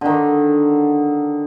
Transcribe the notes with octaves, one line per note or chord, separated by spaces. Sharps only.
D3 D#3